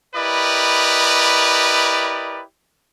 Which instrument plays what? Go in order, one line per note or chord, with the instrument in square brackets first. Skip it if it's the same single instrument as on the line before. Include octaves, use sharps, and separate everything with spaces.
[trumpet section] E4 G4 A#4 B4 D5 D#5